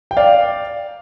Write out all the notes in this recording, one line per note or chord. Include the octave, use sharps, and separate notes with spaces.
G5
D5 F5